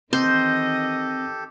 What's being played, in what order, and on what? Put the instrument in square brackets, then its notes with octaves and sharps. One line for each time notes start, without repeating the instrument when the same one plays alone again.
[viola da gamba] D#3 E3 D#5 [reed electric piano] C4 [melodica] G4 A4 [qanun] C5